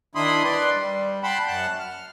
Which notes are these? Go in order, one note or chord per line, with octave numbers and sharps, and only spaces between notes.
D#3 D4 E4 B5 C6 D#6
B4 D5 C6
G3
F#5 G5 A5 B5 C6
F#2 F#5 A5 F#6
F6